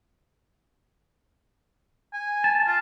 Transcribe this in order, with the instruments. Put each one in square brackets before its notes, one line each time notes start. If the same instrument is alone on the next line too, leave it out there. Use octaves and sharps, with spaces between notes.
[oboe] G#5
[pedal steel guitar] A5
[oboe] F4